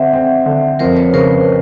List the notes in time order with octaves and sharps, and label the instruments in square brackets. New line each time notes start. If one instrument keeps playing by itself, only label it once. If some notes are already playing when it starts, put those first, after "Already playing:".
Already playing: [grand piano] D3 C4 [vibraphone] E5 F#5
[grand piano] C4
D3
[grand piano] F2 [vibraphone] A#4 C5
[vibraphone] B4 C#5
[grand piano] C#3 [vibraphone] A#4 C5